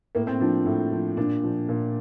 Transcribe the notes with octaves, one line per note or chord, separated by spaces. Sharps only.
A2 A#3
C4
F3 D4
A2
F3
A#2 D4
F3
A#2